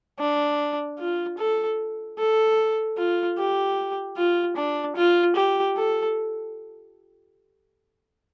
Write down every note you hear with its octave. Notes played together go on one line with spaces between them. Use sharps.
D4
F4
A4
A4
F4
G4
F4
D4
F4
G4
A4